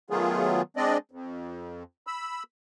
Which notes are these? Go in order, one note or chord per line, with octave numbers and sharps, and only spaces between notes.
D#3 F#3 A3 B3 F4 G#4
G#3 C4 D4 D5 D#5
F2
B5 E6